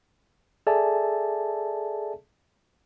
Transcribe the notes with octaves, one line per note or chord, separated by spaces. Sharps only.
G#4 A4 D5 E5 G#5 A5